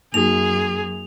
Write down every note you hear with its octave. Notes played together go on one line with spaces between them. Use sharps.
F#2 A#3 D#4 F#4 G#4 F7